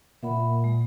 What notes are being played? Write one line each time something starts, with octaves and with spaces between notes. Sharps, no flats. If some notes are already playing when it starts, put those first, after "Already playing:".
A#2 E5 F#5 B5
G#3